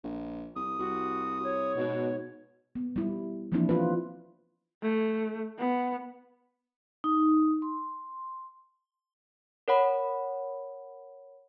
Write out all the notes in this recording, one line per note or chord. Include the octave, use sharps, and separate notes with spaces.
A#1
C2 D#6
C2 F#4
C#5
G#2 B2
B3
G3 E4
E3 F3 A#3 C4 D4 E4
F4 B4
A3
B3
D#4
C6
A#4 C#5 F#5 B5